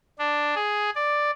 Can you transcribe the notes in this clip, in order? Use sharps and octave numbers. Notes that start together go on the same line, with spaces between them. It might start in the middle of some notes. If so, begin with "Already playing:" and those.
D4
G#4
D5